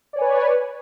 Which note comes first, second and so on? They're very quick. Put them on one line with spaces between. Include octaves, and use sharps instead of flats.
D5 C#5 G#5 B4